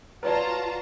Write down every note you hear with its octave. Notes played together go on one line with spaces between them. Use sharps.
F4 F#4 B4 C#5 D5 A5 A#5